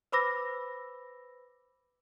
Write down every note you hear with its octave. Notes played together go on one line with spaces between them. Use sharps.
B4 C5 B5 D6 E6 A#6